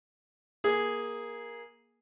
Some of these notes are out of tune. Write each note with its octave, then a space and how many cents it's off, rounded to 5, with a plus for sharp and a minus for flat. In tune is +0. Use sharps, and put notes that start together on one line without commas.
A#3 +15 G#4 +0